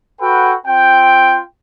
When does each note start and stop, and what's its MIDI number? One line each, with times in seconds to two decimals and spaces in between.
0.21 0.53 66
0.21 0.53 69
0.21 0.53 71
0.21 0.53 78
0.21 0.53 79
0.67 1.40 60
0.67 1.40 65
0.67 1.40 79